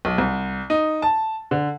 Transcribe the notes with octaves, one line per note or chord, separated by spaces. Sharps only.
B1
C2
D#4
A5
D3